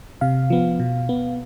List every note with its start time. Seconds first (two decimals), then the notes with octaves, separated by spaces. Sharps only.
0.21 C3 F5
0.50 F3 B3
0.80 B2
1.09 B3